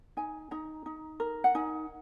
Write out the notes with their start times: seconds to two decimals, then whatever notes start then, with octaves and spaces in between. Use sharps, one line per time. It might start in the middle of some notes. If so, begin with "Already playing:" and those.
0.17 D#4 G#5
0.51 D#4 A#5
0.86 D#4
1.20 A#4
1.44 F#5
1.55 D#4 G#5